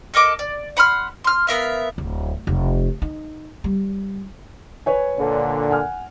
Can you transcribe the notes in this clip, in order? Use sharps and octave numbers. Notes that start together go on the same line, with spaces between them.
A4 A#4 D#5 D6
D5
F#5 B5 C6 F6
C6 F6
B3 A#4 E5 F5
D1
F1
D#4
G3
B4 C#5 G#5
A#2 D3
F#5 G#5 F6